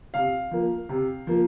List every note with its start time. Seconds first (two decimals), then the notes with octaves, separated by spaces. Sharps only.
0.14 C3 F5
0.51 F3 A#3
0.89 C3
1.27 F3 A#3